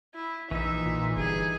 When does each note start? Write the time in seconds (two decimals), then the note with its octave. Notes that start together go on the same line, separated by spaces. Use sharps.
0.15 E4
0.51 A#1 E3 D#4 E5
0.86 A#2
1.17 G1 G#4